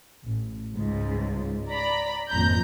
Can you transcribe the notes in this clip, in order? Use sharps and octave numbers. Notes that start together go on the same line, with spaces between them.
A1
C#2 G#2
D5 A#5 B5
G#1 F2 A#2 A#5 G6